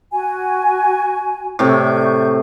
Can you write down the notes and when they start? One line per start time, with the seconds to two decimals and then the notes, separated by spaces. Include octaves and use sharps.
0.12 F#4 G#5
1.59 A2 C3 D5 C#6 G6